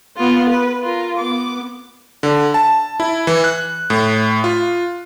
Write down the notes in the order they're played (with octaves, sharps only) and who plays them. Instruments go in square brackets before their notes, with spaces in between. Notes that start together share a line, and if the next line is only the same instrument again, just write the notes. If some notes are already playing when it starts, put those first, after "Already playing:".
[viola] B3 F4
B4
F4 A#4
B3 D6
[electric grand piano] D3
A5
E4
E3
F#6
A2
F4